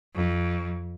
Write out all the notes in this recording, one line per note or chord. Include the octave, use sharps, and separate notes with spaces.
F2